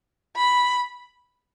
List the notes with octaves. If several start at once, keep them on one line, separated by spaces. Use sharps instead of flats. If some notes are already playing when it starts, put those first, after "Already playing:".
B5